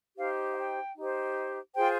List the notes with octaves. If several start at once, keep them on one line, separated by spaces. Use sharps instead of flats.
D#4 G4 C5 F5
F5
G5
D#4 G4 C5
F4 G#4 C5 G5